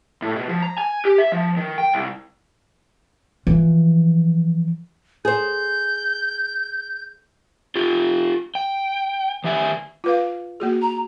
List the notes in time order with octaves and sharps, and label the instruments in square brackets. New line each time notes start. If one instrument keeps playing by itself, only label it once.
[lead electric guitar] A2
B2
F3
A#5
G#5
G4
E5
F3
D#3
G5
C2
[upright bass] E3 F3
[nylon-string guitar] G#4 C5 [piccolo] G6
[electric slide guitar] F4 G4
G5
D#3 G4 E5 G#5
[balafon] F4 B4 F5
A#3 F#4 G#4
[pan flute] A#5